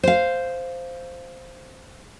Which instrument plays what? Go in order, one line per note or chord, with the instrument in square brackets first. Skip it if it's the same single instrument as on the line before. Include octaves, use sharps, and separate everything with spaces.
[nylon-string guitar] C5 F5